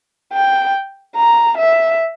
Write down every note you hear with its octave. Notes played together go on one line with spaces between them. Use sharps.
G5
A#5
E5